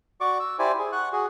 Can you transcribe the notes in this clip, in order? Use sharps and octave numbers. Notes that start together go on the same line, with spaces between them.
F#4 D5 C#6 D6
E6
E4 G4 C5 D5 G#5
G#4
F#5 C#6 F#6
F#4 G#4